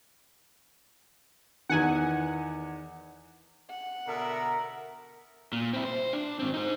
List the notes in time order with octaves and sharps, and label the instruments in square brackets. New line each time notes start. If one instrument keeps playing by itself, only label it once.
[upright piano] E2 D#3 [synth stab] F#5 G#5
[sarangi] F#5
[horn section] B2 D3 E5 [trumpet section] A#4
[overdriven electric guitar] A#2
C4 E4
C5
D4
G#2 C4
D#4 C5